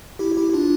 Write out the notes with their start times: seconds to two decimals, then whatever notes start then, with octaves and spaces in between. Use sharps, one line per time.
0.19 E4 G4
0.37 E4 G4
0.53 D4 F4